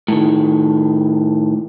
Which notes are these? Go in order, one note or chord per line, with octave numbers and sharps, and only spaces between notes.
A2 D#3